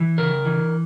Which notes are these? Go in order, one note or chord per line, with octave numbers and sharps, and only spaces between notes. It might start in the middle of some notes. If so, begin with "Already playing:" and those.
Already playing: E3
C#3 A#4
E3